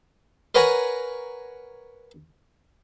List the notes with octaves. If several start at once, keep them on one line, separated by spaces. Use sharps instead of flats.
A#4 B4 C#5 F#5 G#5 A#5